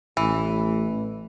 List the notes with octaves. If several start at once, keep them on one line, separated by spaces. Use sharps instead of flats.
A1 E3